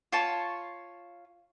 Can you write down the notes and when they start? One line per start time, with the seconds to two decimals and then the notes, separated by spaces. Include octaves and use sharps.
0.12 F4 C#5 A5